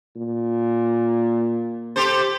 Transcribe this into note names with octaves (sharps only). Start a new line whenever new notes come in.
A#2
G4 A4 C5